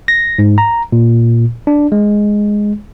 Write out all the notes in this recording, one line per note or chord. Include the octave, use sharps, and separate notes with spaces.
A#6
G#2
A#5
A#2
D4
G#3